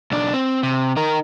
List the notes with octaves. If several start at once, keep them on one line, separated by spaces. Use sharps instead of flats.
B1 D4
C4
C3
D#4 A#4